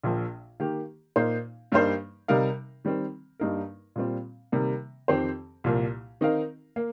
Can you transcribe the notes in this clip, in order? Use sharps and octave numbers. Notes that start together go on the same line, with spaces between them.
A#1 A#2 F3
D#3 A#3 G4
A#2 A#3 D#4 C5
G2 G3 A#3 D#4 C5
C3 G3 D#4 A#4 F5
D#3 G3 C4
G2 G3 A#3 D#4 A#4
A#2 G3 C4 F4
C3 D#3 G3 A#3
F2 D#3 C4 G4 C5
C2 A#2 F3 A#3
D#3 C4 D#4 A#4 F5
A#3